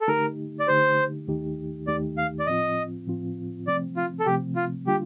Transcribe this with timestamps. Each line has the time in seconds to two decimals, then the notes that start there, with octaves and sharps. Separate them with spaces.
0.01 A4
0.08 D3 A3 D#4 G4 A#4
0.60 D5
0.68 D3 A3 D#4 G4 C5
1.27 D#2 D#3 A3 D#4 G4
1.87 D#2 D#3 A3 D#4 G4 D5
2.18 F5
2.39 D5
2.47 A2 F3 C4 F4 D#5
3.07 A2 F3 C4 F4
3.67 C3 F3 A3 C4 D5
3.97 F4
4.20 A4
4.26 C3 F3 A3 C4 G4
4.56 F4
4.86 D3 G3 A#3 D4 F4 G4